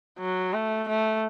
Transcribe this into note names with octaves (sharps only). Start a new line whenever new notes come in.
F#3
A3
A3